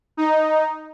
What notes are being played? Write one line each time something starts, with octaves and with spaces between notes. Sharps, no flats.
D#4